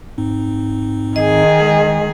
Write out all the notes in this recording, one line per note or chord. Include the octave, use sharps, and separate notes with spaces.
G#2 C4 D#4
D#3 G#4 D#5
G#3